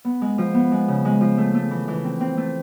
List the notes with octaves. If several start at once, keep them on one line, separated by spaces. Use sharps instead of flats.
B3
G#3
F3
B3
G#3
C#3
G#3
F3
A3
A3
E3
E3
C4
C4
A3